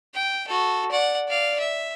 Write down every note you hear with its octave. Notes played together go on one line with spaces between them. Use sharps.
G5
F#4 A4
D5 F#5
D5 F5
E5